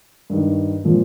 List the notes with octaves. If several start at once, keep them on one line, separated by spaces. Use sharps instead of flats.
G2 D#3
A#2 F3